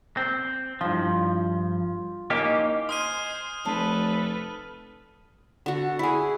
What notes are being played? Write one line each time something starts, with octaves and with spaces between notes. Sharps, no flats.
C4
G2 F3 F4
A#3 C#4 D#4 G4
C5 G#5 C6 D#6 F6 D#7
F1 A4 B4 C5 A5
D3 F#4
E4 G#4